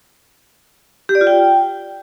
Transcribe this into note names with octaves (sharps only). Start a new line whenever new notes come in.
G4
D5
F4
G5